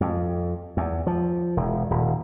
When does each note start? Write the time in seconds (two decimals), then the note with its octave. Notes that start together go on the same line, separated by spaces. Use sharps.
0.01 F2
0.77 E2
1.07 F3
1.57 E1
1.91 D#1